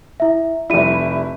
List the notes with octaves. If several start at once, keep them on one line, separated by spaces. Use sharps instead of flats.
E4 E5
F1 G3 E4 E5 D#7